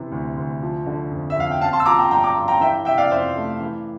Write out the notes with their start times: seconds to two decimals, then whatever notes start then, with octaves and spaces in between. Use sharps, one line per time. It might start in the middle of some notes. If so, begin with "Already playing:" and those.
Already playing: C3 E3
0.12 D2
0.37 D2
0.62 F3
0.86 D3
1.11 F2
1.30 E5
1.36 F2 F5
1.51 G5
1.61 C4 F5 A5
1.73 A5 C6
1.80 E6
1.85 F3 A#5 D6
1.99 G5 A#5
2.11 G2 G5 A#5
2.23 A#5 D6
2.37 G2
2.48 G5 A#5
2.61 E3 E5 G5
2.85 C3 E5 G5
2.98 D5 F5
3.11 F2 C5 E5
3.36 A3
3.60 E3